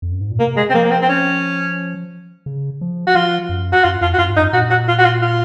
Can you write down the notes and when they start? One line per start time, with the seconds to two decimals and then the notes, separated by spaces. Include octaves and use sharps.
0.02 F2
0.12 F#2
0.21 G#2
0.31 A#2
0.39 C3 A#3
0.57 G#3
0.70 C4
0.74 F3 A#3
0.84 A#3
0.91 C4
1.02 C4
1.09 C#4
2.46 C#3
2.81 F3
3.07 F#4
3.15 F3 F4
3.49 F#2
3.73 F#4
3.83 F#2 F4
4.01 F2 F4
4.14 F#4
4.18 F#2 F4
4.30 G#2
4.36 F#2 D#4
4.53 A#2 F#4
4.70 F#4
4.88 F4
4.98 F#4
5.05 F4
5.22 F4